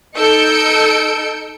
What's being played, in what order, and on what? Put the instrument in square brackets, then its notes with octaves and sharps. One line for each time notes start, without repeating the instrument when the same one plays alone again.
[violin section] D#4 A4 E6 G6 C#7 D7